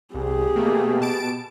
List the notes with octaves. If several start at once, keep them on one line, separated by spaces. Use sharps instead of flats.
C2 G4 G#4
B2 A3 A#3
B2 A5 D7